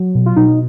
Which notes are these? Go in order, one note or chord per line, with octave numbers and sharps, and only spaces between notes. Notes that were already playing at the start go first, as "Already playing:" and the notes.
Already playing: F#3
B2
F4
B2 D#4